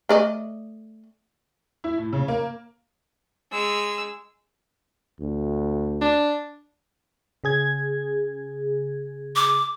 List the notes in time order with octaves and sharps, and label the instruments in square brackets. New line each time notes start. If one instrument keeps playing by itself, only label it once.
[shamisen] A3 D5 D#5
[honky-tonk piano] E4
A2
C#3
A#3
[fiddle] G#3 E6
[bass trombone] D2
[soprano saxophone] D4
[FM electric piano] C#3 G#4 G#6
[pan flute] D6